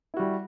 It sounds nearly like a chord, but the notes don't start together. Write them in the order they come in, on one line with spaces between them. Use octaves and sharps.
E4 F#4 G3